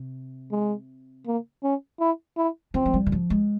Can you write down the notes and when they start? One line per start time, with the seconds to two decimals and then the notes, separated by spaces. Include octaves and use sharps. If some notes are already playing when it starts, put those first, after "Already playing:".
Already playing: C3
0.51 G#3
1.27 A#3
1.63 C#4
2.00 E4
2.37 E4
2.74 F3 C4
2.86 G#3
2.94 G3
3.06 E3
3.12 F3
3.30 G#3